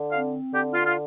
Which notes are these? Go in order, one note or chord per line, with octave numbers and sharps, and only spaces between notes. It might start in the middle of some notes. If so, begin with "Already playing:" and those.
Already playing: D3
C4 F5
D3 G4
F4
F4